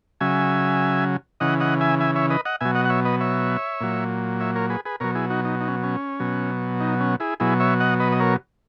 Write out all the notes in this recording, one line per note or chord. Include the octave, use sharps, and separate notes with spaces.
C#3 F#3 E5 G#5
C#3 E3 D#5 F#5
D#5 F#5
E5 G#5
E5 G#5
C#5 E5
B4 D#5
D#5 F#5
B2 F#3 E5 G#5
D#5 F#5
F#5
C#5 E5
B4 D#5
C#5 E5
A#2 F#3
C#5 E5
A#4 C#5
G#4 B4
G#4 B4
B2 F#3 A#4 C#5
E4 G#4
D#4 F#4
D#4
D#4
C#4
C#4
B2 F#3
D#4
C#4
E4 G#4
B2 F#3 E4 G#4
C#5 E5
D#5 F#5
B4 D#5
D#5
A#4 C#5